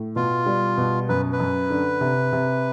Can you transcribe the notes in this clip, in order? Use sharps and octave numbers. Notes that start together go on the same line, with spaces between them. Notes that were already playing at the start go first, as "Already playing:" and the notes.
Already playing: A2
B2 F4
G3
B2
F#2 B4
B4
F#2
D3
C3
C3